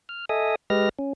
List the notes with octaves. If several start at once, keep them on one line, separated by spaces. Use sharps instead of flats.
F6
A4 D#5 E5 G#5 D#6
G#3 G4 B4 D#5 F6 A#6
C#4